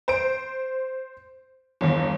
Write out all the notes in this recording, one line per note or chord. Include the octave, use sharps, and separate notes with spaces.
C5 D7
G1 E2